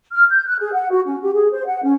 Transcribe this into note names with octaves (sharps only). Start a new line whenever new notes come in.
F6
G6
F#6
G#4
F#5
F#4
C#4
G4
G#4
C5
F#5
C#4